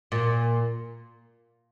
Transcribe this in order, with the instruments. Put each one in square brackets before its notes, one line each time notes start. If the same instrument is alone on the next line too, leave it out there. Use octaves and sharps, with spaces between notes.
[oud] A#2